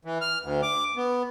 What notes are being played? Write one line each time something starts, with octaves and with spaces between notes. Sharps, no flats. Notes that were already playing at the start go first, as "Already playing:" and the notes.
E3
F6
D2
D6
B3